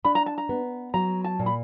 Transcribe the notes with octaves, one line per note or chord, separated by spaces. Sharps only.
D4 B5
A#5
A5
A#5
B3
F#3 A#5
A5
A#2
B5